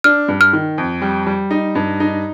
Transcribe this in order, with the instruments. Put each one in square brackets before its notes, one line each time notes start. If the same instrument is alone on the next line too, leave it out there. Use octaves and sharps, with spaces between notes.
[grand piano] D4 [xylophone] F6
[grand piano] G2
[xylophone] F6
[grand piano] D#3
F2
G3
G3
D#4
G2
D#4